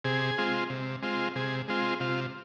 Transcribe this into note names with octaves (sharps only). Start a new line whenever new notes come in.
C3 G#4
G#3 C4 F4
C3
G#3 C4 F4
C3 G#4
G#3 C4 F4
C3 F4